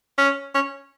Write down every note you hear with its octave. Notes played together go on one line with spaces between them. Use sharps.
C#4
C#4